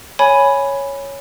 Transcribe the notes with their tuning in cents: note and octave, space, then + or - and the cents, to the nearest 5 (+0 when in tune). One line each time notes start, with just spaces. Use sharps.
C#5 +0 G#5 +0 B5 +0